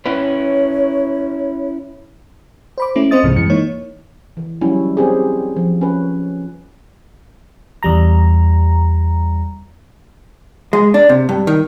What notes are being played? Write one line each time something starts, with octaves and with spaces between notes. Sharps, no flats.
C#4 E4 B4 C#5
C5 B5 D6
A3 C#4 E4
C4 F4 C5 D#5 D#6 A6
C2 G#2 C3 E3 G#3 C4
F#2 E3 G#3 C#7
E3 A#3 D#4 C#5
E3
F#3 G3 C#4 E4
C4 G4 G#4
F3
C#4 B4
E2 G3 A#5
G#3
D4
C3
G2
D#3